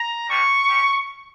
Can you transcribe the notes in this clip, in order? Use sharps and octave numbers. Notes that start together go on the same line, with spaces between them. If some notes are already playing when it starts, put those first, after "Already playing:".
Already playing: A#5
G3 A#3 D4 C#6
C#4 G4